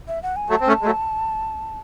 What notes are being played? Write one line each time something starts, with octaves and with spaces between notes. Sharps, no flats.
E5
F#5
G#5
F#3 A3 A5
C4
A3 C#4
G#3
F#3 A3